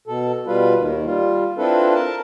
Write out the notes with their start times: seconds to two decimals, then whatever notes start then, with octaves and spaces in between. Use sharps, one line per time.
0.08 B2 A4
0.47 B2 G3 F4 B4
0.79 D#2 D#3
1.05 G3 F4
1.58 C4 D4 E4 F4 A4 B4
1.95 A#4 A5